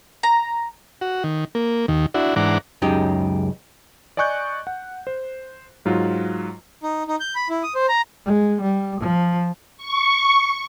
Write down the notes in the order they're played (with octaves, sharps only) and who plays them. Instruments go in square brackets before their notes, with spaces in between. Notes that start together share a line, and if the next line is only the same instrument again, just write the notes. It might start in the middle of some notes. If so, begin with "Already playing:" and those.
[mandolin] A#5
[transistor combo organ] F#4
D#3
A#3
D#2 D#3
D4 E4 F#4
G#2 E3 D4 F#5 A#5 D6
[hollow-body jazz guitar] C#2 F#2 C#3 D#4 G4
[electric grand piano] D5 D#5 G#5 C#6 F#6 G6
F#5
C5
G#2 F#3 F4
[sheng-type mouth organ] D#4
D#4
G6
B5
E4
D#6
C5
A#5
[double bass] G#3
G3
F3
[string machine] C#6